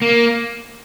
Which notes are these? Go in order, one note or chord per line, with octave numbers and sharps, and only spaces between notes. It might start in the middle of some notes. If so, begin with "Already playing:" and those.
A#3